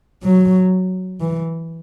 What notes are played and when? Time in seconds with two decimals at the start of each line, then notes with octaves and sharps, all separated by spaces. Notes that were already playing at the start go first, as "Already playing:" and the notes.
0.23 F#3
1.21 E3